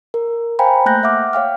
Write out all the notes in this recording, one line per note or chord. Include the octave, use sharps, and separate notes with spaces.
A#4
C5 F5 G5 G#5 A#5 B5
A3 A#3 F#6 G6 A#6
E5 F#5 D6 F6
C#5 F5 G5 F6